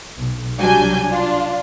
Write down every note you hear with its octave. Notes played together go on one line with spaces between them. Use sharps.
B1
C2 F#3 G3 D4 G#5 G6
D4 F4